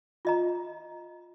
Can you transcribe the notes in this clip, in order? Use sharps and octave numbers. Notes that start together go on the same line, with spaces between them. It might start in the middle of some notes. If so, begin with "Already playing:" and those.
F4 D#5 A#5